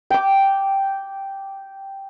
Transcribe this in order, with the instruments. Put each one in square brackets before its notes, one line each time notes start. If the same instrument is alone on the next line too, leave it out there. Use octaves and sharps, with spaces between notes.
[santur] G5 D6